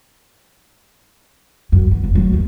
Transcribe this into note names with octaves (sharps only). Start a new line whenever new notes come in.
F#2
E2
F1
F#3 A3
D#2